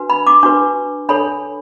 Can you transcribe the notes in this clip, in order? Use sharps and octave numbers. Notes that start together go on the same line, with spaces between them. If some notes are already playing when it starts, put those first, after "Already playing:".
Already playing: D4 F#4 B4
B5
D6
D4 F#4 B4 C#6
D4 A4 C#5 B5